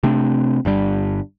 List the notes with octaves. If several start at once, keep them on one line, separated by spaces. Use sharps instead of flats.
C3 A3 C4 D4
G1 G2 G3